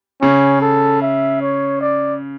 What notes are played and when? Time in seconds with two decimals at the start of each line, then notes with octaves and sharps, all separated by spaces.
0.22 C#3 C#4
0.62 A4
1.02 E5
1.41 C#5
1.81 D5